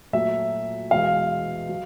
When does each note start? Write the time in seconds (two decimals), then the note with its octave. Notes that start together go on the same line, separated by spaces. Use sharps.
0.13 A#2 F#3 A3 E5
0.91 E2 B2 G#3 F5
1.69 F#3